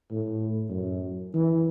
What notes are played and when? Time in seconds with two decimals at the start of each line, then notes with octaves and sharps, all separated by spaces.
0.11 A2
0.70 F#2
1.34 E3